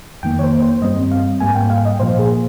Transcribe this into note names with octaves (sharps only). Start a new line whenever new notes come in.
F2 D#3 A#3 G5
C#5
C5
C5
G2 G3 C4 D#5
F5
G#2 G3 A#3 G#5
G5
F5
D#5
A#2 F3 A#3 C5
G#4